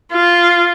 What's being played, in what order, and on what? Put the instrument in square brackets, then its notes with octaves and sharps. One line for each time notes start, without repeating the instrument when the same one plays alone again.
[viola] F4